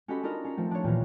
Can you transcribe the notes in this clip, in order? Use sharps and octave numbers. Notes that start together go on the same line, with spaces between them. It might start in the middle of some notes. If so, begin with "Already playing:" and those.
C#4 F#4 G4 A4 D#5 B5
D4 D#4 F4 A#4 D#5
C#4 A#5 C7
F3 A3 C4
D4 C#5
D#2 A#2 E3 A#4